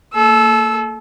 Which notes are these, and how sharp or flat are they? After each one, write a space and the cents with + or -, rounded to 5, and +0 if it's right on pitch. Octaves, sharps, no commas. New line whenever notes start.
A#3 -30 A4 -35 E6 +0